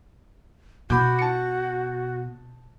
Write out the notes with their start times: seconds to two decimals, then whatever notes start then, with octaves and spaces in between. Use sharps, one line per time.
0.90 B2 F#4 B5 D6 G6
1.19 A5 C#7